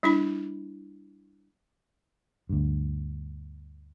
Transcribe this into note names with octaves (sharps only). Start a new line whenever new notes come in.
G3 D4 E4 B5
D2 G2